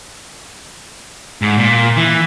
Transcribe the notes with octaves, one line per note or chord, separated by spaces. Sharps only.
G#2
A#2
E3